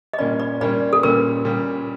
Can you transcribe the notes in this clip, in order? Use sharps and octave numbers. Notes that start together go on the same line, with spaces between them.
D#5
A#2 G3 A#3 C#4 D5
D5
A#2 G3 A#3 C#4 D5
A4
A#2 G3 A#3 C#4 A#4
A#2 G3 A#3 C#4